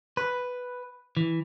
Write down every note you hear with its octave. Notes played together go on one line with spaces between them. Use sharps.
B4
E3